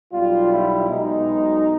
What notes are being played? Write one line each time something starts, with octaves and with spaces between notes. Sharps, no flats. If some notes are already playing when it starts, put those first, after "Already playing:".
B1 B2 G3 F4
E4
B1 B2 G#3 D#4